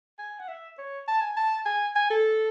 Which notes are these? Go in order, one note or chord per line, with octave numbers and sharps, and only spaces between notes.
G#5
F#5
E5
C#5
A5
G#5
A5
G#5
G#5
A4